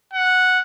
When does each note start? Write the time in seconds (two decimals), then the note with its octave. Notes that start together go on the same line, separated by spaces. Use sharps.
0.14 F#5